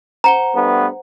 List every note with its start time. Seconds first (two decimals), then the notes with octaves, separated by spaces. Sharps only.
0.24 C5 F#5 A#5 G7
0.55 G2 A3 B3